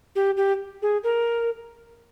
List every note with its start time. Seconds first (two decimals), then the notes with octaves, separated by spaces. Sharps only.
0.15 G4
0.37 G4
0.82 G#4
1.03 A#4